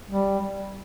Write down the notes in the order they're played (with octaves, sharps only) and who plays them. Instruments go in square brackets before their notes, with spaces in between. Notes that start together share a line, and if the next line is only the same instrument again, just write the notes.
[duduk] G3